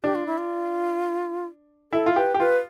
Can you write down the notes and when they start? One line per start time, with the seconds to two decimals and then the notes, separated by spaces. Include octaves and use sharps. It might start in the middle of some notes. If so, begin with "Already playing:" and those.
0.03 D4 G4
0.15 F4
0.26 E4
0.38 F4
1.92 E4 A4
2.06 F4
2.16 G4 B4
2.34 G4
2.40 F4 B4